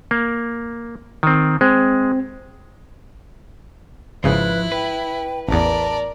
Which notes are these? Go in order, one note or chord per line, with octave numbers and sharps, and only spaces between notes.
A#3
D#3 C4
G#3 C4
G#1 C#3 F3 E4 B4
B4 G5
A1 E2 A#4 D5 A5